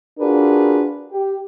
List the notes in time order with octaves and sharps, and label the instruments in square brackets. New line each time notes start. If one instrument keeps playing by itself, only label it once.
[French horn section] D4 F4 F#4 G#4 A#4 B4
G4